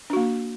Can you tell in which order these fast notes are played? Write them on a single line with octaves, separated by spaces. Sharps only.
D4 F#4 A#3